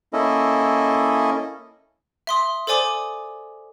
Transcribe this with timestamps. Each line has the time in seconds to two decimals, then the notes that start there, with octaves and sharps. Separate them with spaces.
0.13 A#3 C#4 E4 A4 D#5
2.27 E5 C6 D#6
2.67 A4 C5 D5 G#5 D6 D#6